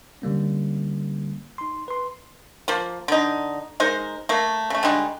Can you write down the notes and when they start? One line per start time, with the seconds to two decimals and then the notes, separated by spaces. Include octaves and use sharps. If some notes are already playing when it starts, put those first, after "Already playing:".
0.22 D3 G3 A#3 C#4
1.58 D#4 C6
1.88 B4 C6
2.68 F3 A#3
3.08 D3 D#4
3.80 G#3 D#4 A#4 C5
4.29 A3 A#3
4.70 C#3 A3
4.83 D3 G3 G#3 D#4